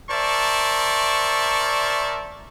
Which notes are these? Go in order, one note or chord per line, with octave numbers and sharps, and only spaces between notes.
A#4 C5 D5 E5 A5 C#6